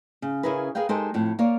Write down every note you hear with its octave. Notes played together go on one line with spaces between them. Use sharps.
C#3
C#3 C#4 E4 G#4 A#4 B4
G#4 A#4 B4 F5 G5
G#3 D#4 G4 A4 A#4 C5
F2 A2
A#3 A#4 C#5 D5 F5